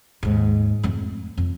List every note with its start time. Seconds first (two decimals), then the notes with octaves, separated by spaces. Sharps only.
0.23 D#2 G#2
0.83 F2 A3
1.37 F2